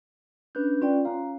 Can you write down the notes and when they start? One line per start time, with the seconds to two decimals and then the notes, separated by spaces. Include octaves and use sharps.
0.55 C#4 D4 B4 F#6 G6
0.82 C#4 F4 D5 G5
1.05 C#4 F5 A#5